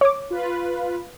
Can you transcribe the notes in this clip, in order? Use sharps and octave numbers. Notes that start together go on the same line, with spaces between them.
C#5 D6
F4 B4